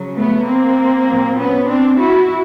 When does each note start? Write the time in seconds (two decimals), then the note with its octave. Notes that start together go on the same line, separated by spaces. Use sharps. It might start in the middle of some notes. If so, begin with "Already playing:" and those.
Already playing: C#3 F#3
0.15 A3 B3
0.45 A#3 C4
1.07 A#2 F#3
1.37 B3 C#4
1.67 C4 D4
1.98 E4 F#4